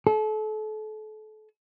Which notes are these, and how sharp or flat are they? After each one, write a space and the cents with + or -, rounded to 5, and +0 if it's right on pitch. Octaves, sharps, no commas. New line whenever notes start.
A4 -35